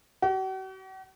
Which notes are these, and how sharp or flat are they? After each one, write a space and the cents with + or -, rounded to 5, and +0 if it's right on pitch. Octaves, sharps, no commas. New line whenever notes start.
F#4 +45